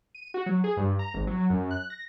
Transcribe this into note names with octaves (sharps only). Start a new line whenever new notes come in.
D#7
F#4
F#3
G#4
G2
A#5
G#1
F#3
F#2
F#6
A#6